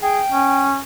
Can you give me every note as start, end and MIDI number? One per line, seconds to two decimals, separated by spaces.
0.02 0.20 68
0.02 0.65 79
0.30 0.79 61